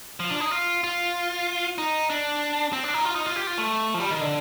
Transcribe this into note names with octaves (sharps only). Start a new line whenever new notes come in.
F3
D4
D#4
F4
F4
D#4
D4
C4
D4
D#4
F4
D#4
F4
G4
F4
A3
F3
G3
D#3
D3